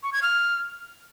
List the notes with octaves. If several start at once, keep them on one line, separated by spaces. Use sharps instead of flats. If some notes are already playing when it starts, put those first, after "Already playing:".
C#6
G#6
F6